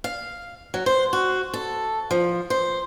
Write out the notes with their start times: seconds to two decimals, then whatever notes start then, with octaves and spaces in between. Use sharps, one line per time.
0.04 F5
0.74 F#3
0.86 C5
1.13 F#4
1.54 A4
2.11 F3
2.50 C5